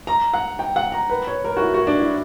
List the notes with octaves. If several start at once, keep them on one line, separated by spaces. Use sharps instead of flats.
A#5
F#5
G5
F#5
A#5
B4
C#5
A#4
F#4
E4
F#4
D4
E4